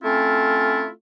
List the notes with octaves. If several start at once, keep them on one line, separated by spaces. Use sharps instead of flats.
A3 C4 C#4 E4 F4